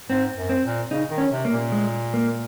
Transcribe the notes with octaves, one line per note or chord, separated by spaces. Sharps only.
G#2 C4
F#2
C4
A#2
C#3 D#4
D#3
C#4
C3
A#3
A#2
G#3
A#3